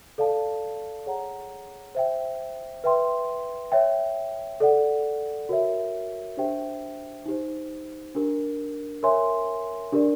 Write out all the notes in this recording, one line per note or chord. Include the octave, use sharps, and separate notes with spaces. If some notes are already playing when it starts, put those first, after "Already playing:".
A4 D5 F5 A5
G#4 C#5 F#5 A#5
C5 E5 G5
B4 E5 G5 C6
C#5 E5 G5
A4 D5 F#5
F#4 A#4 C#5 E5
D4 G4 C5 E5 G5
D#4 G4 C5
D4 G4 A#4
A#4 C#5 E5 G#5 C6
D4 G4 A#4 D5